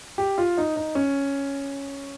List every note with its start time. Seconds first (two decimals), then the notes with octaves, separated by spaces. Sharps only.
0.18 G4
0.38 F4
0.58 D#4
0.76 D#4
0.95 C#4